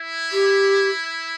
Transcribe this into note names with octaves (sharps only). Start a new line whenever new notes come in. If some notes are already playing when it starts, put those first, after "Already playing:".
Already playing: E4
G4